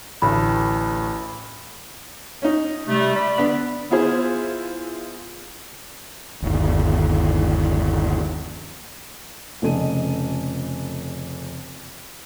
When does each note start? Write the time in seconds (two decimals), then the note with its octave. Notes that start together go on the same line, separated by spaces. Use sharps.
0.22 A1 D2 B5
2.42 C#4 D#4
2.88 C3 G3 A3
3.14 D5 B5
3.38 D3 B3
3.90 B3 E4 F4 G#4 C5
6.42 G1 D#2
9.62 F1 C#3 A4 D#5 D#7